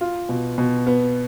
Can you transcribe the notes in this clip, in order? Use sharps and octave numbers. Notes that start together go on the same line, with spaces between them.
F4
B2
B2
B3